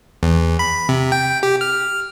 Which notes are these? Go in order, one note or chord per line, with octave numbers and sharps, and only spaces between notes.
E2
B5
C3
G5
G4
F6